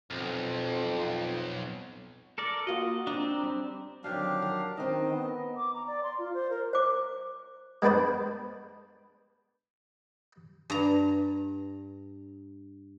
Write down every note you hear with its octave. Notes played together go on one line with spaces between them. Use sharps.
B1 F2
A4 A#4 D5
A#3 F4 F#4 D#5
C4 D4 A#5
G3
F2 D3 D#3 F#3 D4 G4 F5
A#4
D#3 C4 D4 D#5
B3
D6
A#5
D5
C6
F4
C5
A#4
C5 D6
G#3 B3 D4 B4 C5
G2 A#5